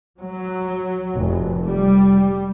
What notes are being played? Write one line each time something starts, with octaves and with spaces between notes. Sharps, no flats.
F#3
F1
G3